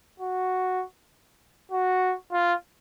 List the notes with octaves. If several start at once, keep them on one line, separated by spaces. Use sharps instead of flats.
F#4
F#4
F4